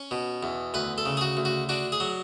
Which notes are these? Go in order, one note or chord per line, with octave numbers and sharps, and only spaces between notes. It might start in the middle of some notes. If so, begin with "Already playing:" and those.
Already playing: C#4 C#5
B2
E2
D2 B4
A4
C#3
G#4
F#4
D2
F#4
D4 F#4
G#4
F#3